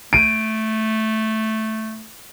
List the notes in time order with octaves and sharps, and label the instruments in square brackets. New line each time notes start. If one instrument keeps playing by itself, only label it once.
[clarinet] A3 [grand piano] D7 D#7